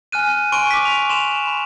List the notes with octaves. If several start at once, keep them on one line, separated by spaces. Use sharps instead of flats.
G#5 F6 F#6 D#7
G#5 C6 C#6 D7 D#7
D6 B6
F7
C6 E7 F7
B5